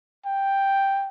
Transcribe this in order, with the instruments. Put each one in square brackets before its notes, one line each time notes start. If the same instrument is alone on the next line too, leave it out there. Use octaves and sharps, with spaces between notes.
[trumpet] G5